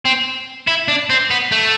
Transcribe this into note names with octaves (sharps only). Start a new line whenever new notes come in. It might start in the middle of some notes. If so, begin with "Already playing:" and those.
C4
E4
D4
C4
B3
A3